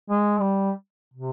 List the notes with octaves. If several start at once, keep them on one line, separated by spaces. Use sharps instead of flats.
G#3
G3
C3